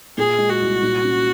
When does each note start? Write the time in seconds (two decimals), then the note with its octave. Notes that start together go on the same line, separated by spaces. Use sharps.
0.18 A#2 G#4
0.38 G#3
0.49 F#4
0.61 C2
0.83 A#2
1.04 C#4